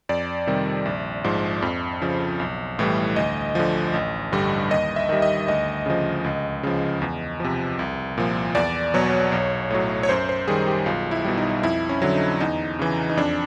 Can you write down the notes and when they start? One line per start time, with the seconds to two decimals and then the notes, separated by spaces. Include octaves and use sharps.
0.09 F2 D5
0.47 C3 D#3 G3
0.85 A#1
1.24 G#2 F3
1.62 F2
2.01 C#3 F3
2.40 B1
2.79 A2 E3 G3
3.16 D2 D#5
3.55 D3 F3
3.94 A1
4.32 G2 D3 G3
4.70 D#2 D#5
4.96 E5
5.09 D#3 G3
5.22 D#5
5.48 D2 D#5
5.86 C#3 F3
6.24 C#2
6.63 C#3 F3
7.02 E2
7.40 C3 F3
7.79 C2
8.18 A#2 F3
8.55 E2 D5
8.94 B2 F#3 C#5
9.32 B1
9.71 A2 F#3
10.03 C#5
10.09 F#2 C5
10.29 C5
10.48 D#3 G3 G#4
10.67 G4
10.86 B1 F4
11.11 E4
11.24 B2 G3
11.37 D#4
11.63 F2 E4
11.89 C#4
12.02 D3 F#3
12.14 D#4
12.40 E2 D#4
12.79 C#3 E3
13.10 D#4
13.17 F2 D4